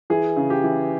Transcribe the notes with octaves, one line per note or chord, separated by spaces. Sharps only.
E3 G#4
C#3
G4
E3